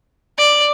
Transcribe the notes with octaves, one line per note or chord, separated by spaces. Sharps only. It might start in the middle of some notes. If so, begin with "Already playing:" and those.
D5